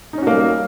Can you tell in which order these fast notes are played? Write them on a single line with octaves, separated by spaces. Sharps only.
D#4 C#4 F#4 A#3 G3